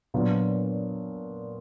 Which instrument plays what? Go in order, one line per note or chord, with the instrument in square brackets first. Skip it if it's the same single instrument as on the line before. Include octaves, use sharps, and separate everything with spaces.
[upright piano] A#2 F#3 B3 D4 F4